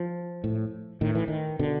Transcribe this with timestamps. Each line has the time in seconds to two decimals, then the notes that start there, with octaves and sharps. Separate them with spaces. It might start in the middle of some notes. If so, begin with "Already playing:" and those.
Already playing: F3
0.44 A2
1.01 A2 D#3
1.15 E3
1.28 D#3
1.59 B2 D3